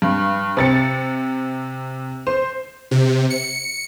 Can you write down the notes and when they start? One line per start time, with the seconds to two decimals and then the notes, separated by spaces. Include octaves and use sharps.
0.02 G2
0.57 C3 A6 C#7
2.27 C5
2.91 C3
3.30 C#7